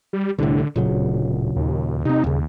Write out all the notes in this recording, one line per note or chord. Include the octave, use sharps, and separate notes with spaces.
G3
C2 A2 D3
D1 A#2 C#3 F#3
D#2
C3 C4 D#4
D#1 D#2 C#3